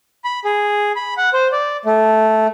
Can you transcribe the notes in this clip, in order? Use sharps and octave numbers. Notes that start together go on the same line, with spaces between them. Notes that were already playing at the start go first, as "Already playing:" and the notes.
B5
G#4
B5
F#5
C5
D5
A3